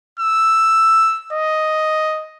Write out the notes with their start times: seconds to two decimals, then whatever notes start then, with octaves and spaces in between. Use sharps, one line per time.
0.19 E6
1.33 D#5